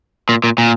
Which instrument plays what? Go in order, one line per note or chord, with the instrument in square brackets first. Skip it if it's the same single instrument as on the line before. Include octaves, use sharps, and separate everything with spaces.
[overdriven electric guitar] A#2
A#2
A#2